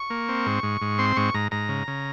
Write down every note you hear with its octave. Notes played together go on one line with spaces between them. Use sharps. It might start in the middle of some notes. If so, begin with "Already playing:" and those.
Already playing: C#6
A#3
C4
G#2
G#2
G#2
C4 C6
G#2 C#6
G#2 A#5
G#2 A#5
C#3
C#3